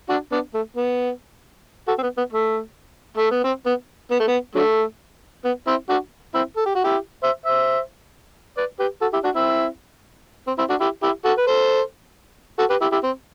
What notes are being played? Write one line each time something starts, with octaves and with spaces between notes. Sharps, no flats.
D4 F#4
B3 D4
A3
B3
F#4 A4
C4
B3
B3
A3
A3
B3
C4
B3
B3
A3
B3
D3 F#3 A3
B3
C4 E4
D4 F#4
C4 E4
A4
G4
F#4
E4 G4
C5 E5
C5 E5
B4 D5
G4 B4
F#4 A4
E4 G4
D4 F#4
C4 E4
C4
C4 E4
D4 F#4
E4 G4
E4 G4
F#4 A4
B4
A4 C5
F#4 A4
G4 B4
E4 G4
E4 G4
C4